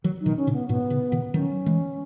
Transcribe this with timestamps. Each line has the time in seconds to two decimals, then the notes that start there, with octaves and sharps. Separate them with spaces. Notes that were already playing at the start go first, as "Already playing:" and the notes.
0.04 D#3 F#3
0.21 D#4
0.26 B2 D#3
0.37 C#4
0.47 A2 C#3
0.53 B3
0.69 G#2 B2 B3
0.90 A2 C#3
1.12 B2 D#3
1.34 D#3 F#3 C#4
1.66 E3 G#3